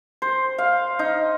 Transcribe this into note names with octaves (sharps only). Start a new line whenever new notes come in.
C5
F5
D#4